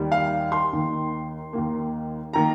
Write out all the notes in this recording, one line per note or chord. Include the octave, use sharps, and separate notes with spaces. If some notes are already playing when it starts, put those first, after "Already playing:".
Already playing: D#2 D#3 G3
F5
C6
D#2 D#3 A#3
D#2 D#3 A#3
D#3 A#3 A#5